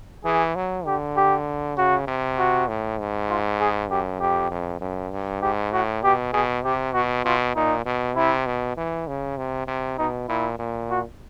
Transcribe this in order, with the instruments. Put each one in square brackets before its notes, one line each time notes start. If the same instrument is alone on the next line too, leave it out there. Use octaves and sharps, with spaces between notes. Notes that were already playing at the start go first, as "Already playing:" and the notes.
[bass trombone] E3 [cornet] G#4
[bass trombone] F#3
[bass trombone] D3 [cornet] G4
[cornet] G4
[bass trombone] C#3 [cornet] F#4
[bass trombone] C3
[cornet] F#4
[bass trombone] A2
G#2
[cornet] F4
G#4
[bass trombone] F#2 [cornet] G4
[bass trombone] F2 [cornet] G4
[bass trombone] F2
F#2
G2
[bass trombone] G#2 [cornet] G4
[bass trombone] A2 [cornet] F#4
[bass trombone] B2 [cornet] G4
[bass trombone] B2 [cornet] G#4
[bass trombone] C3 [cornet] G4
[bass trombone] B2 [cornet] F#4
[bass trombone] B2 [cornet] F4
[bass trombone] A#2 [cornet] D#4
[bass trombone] B2
[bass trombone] C3 [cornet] E4
[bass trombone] B2
E3
C#3
C3
C3
[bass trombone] B2 [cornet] D#4
[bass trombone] A#2 [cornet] E4
[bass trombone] A#2
[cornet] F#4